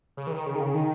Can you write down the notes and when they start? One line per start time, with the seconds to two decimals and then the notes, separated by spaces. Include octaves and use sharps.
0.17 C#3
0.27 E3
0.32 D#3
0.47 C#3
0.55 D#3
0.61 C#3
0.74 D#3